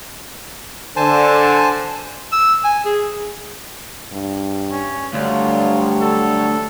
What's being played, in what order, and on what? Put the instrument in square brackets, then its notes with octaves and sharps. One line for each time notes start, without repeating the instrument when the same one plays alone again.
[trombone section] D3 [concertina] C5 G#5 A5
[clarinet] E6
G#5
G#4
[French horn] G2
[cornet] C#4
[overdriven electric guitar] D2 [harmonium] F#3 D4 C#5 [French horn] G3 [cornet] F4
[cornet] A4